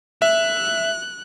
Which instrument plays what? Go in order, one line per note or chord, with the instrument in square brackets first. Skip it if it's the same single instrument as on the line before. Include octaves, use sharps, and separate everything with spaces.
[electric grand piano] E5 [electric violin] F#6